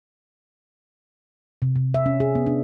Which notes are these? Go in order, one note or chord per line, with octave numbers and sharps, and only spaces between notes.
C3
C3
E5
C#4
G#4
B3
D4